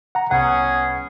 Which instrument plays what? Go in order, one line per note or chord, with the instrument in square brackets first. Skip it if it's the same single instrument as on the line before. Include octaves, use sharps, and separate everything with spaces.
[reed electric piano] F#5 A#5
[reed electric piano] C2 F#5 [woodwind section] B3 C#4 G#4